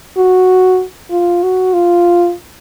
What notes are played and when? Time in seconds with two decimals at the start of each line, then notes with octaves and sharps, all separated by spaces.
0.17 F#4
1.11 F4
1.43 F#4
1.73 F4